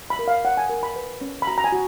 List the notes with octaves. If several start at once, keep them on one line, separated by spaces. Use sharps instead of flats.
B5
A#4
F5
C#5 F#5
G#5
A#4
B5
B4
C#4
B5
F#4 A#5
A#5
G#5
F#4